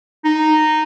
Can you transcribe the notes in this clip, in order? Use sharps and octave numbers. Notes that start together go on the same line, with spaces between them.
D#4